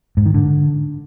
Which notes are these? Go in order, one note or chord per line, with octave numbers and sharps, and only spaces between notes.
G#2
D#3
D3